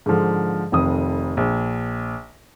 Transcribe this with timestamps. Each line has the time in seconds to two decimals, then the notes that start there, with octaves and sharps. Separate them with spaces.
0.06 G#2 D3 F3
0.72 F1 F2 D#3 D#6
1.37 A#1